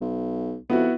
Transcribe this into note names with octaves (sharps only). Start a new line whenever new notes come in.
B1
F2 B3 E4 F#4